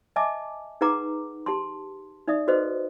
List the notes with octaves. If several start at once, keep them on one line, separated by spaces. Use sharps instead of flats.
D#5 E5 G#5 A5 D6
D#4 G#4 B4 F#5 A#5 D6
G4 A5 C6
D#4 D5 E5 D#6
F#4 A4 B4 C5 D#5